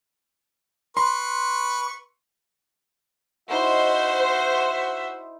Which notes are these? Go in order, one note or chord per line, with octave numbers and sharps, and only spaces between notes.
B4 C6 C#6
C#4 D#4 E4 F#4 C5 E5